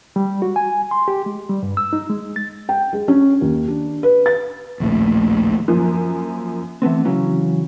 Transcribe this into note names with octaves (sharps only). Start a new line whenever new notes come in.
G3
F#4
G#5
C6
G4
G#3
G3
G2
E6
D#4
G#3
A6
G5
G#3
C#4
D#2
D4
B4
A6
A#1 D#2 A2
F#2 F3 A#3
E3 A3 B3 C4
C#3 E3 F#3 C#4